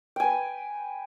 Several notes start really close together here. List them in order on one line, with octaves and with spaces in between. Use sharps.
G5 G#5 B4